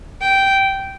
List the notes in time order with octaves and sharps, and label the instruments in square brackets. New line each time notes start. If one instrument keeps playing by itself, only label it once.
[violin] G5